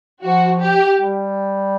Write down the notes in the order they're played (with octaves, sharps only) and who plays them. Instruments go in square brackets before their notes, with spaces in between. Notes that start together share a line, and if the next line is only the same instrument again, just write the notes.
[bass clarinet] F3 [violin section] F#4
[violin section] G4
[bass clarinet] G3